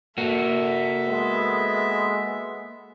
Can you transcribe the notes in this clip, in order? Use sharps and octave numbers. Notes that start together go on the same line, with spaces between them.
A#3 F#4 A4 E5
G#3 B3